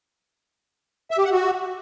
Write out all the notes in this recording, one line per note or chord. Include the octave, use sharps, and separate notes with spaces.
E5
G4
F#5
F#4